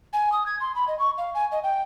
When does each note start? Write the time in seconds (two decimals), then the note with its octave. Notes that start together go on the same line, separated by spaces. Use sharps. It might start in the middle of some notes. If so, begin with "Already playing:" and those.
0.13 G#5
0.32 D#6
0.46 G#6
0.60 C6
0.75 B5
0.88 D#5
0.99 C#6
1.18 F5
1.35 G#5
1.52 D#5
1.63 G5